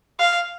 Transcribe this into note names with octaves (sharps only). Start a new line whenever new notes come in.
F5